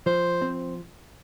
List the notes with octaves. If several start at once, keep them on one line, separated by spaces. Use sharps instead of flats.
F3 C5
C4